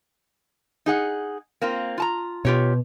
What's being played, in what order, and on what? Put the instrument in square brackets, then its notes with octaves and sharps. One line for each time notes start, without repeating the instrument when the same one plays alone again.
[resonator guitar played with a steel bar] D#4 G#4 F#5
A#3 C4 F4
F4 A5 A#5
[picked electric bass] B2 [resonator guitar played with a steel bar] F4 G4 C#5